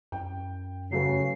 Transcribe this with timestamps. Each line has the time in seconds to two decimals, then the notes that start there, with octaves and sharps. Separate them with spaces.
0.12 F#2 G5
0.92 C#3 F#3 A3 B4 C7